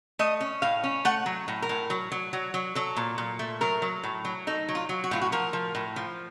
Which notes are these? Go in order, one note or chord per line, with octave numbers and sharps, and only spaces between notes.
A3 D#5
C#4
A2 F5
C#4
A3 F#5
F#3
A2
A#4
A2
F#3
F#3
F#3
F#3
F#3 A4
A#2
A#2
A3
F#3 A#4
F#3
A2
F#3
D#4 A4
F#3
F4
F#3
F#4
A2 F4
F#4
F3 A#4
F3
A2
F3